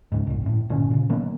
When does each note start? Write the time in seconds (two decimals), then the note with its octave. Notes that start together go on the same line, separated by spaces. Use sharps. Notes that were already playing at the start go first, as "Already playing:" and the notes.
0.12 C#2 G#2
0.27 G1 C2
0.43 G1 A2
0.70 G1 A#2 D3 C#4
0.91 A#2 C#3
1.09 D#3 F#3 A#3 B3